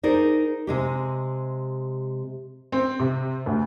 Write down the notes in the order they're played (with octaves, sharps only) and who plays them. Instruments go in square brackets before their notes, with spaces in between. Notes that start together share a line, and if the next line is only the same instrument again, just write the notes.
[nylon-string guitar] D#4 G#4 A#4 C5 D5
C3 G#3 G4
[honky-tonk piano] C4
C3
D2